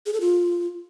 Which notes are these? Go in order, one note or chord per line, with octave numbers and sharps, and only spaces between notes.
G#4
A4
F4